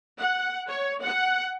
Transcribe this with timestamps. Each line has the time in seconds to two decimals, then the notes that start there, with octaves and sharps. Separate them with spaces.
0.19 F#5
0.69 C#5
1.03 F#5